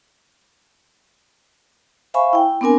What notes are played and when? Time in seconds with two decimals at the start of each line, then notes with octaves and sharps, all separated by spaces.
2.14 C5 E5 F5 G#5 B5 C#6
2.33 E4 G5
2.61 B3 C4 D4 A#4 G#5